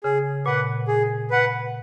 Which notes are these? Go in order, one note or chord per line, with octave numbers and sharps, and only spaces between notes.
C#3 G#4
A#2 B4 F#5
G#4
B4 F#5